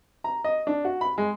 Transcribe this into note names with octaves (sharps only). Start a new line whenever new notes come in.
A#5
D#5
D4
F#4
B5
G#3